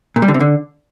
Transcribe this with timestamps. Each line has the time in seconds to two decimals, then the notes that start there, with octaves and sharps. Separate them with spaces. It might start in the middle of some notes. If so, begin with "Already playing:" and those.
0.16 A#2
0.22 G3
0.28 D3
0.34 C3
0.40 D3